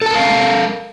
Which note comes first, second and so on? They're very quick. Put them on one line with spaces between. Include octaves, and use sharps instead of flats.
A4 A5 A#4 F5